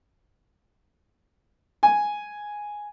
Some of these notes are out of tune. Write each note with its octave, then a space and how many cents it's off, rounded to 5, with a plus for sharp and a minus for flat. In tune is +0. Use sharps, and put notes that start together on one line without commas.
G#5 +0